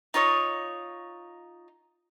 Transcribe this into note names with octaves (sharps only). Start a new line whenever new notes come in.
D#4 F4 C#5 D#5